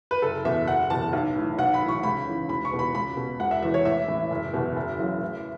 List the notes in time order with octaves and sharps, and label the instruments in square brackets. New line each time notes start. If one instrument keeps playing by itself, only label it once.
[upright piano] B4
F#1 A4
E2 B2 E5
F#1 F#5
E2 B2 A5
B1
A2 E3
B1 F#5
B5
A2 E3
C#6
C#2 B5
C#3 E3
E1 B5
C#6
E2 B2
B5
C#2 B5
B2
E1 F#5
E5
E2 E3 E5
C#5
A1 E5
A2 E3
F#1
E2 B2
F#1
F#2 C#3 E3
A1